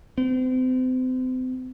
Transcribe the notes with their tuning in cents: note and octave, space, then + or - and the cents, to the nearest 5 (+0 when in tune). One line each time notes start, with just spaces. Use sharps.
C4 -35